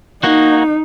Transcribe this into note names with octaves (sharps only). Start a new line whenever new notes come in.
A#3 D#4 F#4